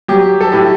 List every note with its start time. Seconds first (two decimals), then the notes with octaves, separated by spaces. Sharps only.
0.08 F#3 G4
0.41 A4
0.52 A2 G4